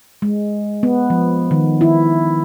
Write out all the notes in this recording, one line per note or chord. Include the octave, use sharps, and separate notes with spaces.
G#3
B3
F3
D#3
E4